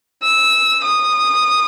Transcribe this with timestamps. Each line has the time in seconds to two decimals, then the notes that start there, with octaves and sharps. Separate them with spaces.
0.23 E6
0.85 D#6